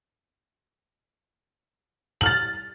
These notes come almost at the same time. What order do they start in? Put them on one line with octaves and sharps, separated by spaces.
F#7 F6 A6